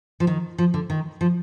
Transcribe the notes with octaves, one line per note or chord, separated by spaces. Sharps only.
F3
D#3
F3
D3
D#3
F3